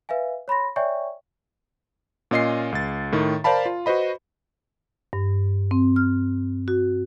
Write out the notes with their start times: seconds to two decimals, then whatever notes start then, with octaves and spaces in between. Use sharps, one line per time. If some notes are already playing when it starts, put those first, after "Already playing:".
0.09 B4 E5 F5 G#5
0.48 C#5 B5 C6 A#6
0.76 C#5 D5 E5 G5 G#5 C#6
2.31 A#2 C#4 F4 D#5 F5 C7
2.72 C#2 A6
3.12 A2 D#3
3.44 A#4 C5 D5 F5 A5 B5
3.66 F4
3.86 F#4 B4 C5 D#5 B5
5.13 G2
5.71 C4
5.96 F6
6.68 F#4